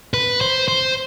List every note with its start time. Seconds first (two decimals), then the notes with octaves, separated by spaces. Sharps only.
0.14 B4
0.41 C5
0.68 C5